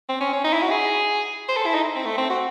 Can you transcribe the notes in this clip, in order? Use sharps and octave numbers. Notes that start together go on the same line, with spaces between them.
C4
C#4
C#4
D#4
E4
F#4
G#4
C5
A4
E4
D#4
C4
A3
C4
F#4